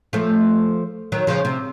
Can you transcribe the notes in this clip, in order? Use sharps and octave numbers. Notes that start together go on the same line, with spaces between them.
F3 A3
D#3 F#3
C#3 F3
C3